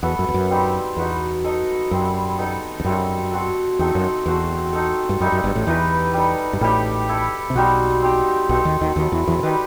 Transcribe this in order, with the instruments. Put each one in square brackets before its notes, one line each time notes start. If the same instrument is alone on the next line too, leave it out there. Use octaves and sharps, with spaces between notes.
[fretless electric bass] E2 [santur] B3 F#4 A4 E5
[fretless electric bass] F#2
E2
F#2
[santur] G3 C4 D#4 G4
[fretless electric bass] E2 [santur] D#4 F#4 B4
[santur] D#4 A4 D#5
[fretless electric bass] F#2 [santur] G3 C4 E4
[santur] B3 D#4 A4 D#5
[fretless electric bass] E2
[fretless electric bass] F#2 [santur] G3 C4 F#4 A4
[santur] C4 F#4 A4
[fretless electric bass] E2 [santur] A3 C4 D#4 A4
[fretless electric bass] F#2
[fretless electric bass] E2 [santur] A3 D#4 F#4 C5
[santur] A3 D#4 A4
[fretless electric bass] G2
[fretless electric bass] F#2 [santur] G3 D#4 A4 E5
[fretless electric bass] F#2
G1 G2
A1 A2
[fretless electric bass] E2 E3 [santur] D#4 G4 B4
[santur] G3 D#4 A4
[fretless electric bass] G2
[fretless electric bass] A1 A2 [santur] G3 D#4 G4
[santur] E4 A4 E5
[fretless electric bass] C3
[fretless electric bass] B1 B2 [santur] G3 C4 D#4 F#4
[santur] C4 D#4 G4
[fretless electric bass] B1 B2 [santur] C4 D#4 F#4 A4
[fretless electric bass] D#2 D#3
D#2 D#3
[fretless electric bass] D#2 D#3 [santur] F#3 A3 E4
[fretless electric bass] E2 E3
E2 E3
C3
[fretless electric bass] D#3 [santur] G3 D#4 G4 B4